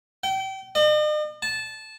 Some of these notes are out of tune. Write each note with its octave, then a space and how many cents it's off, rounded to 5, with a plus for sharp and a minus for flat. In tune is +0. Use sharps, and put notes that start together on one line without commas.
G5 -30
D#5 -45
A5 -15